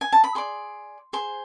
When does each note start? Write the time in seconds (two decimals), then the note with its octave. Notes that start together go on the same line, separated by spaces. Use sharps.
0.01 G#5
0.13 A5
0.24 B5
0.35 G#4 D5 C6
1.13 G#4 C5